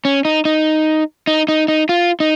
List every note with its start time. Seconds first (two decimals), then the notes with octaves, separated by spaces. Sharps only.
0.05 C#4
0.25 D#4
0.45 D#4
1.27 D#4
1.48 D#4
1.68 D#4
1.89 F4
2.20 D#4